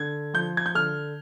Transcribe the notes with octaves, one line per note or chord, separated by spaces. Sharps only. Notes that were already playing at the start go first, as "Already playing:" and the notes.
Already playing: D3 G#6
F3 G6
G#6
G6
D3 F6